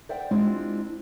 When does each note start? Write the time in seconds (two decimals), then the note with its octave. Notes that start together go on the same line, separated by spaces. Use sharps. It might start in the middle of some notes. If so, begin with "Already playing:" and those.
0.09 C5 D5 E5 F#5 G5
0.31 G#3 C4 D4 E4 F4 G4